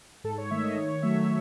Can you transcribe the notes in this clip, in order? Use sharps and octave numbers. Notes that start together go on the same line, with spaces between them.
G#2 A4
C#5
D#3 A3 E5
D#5
D#3 C#5
F#3 A3 E5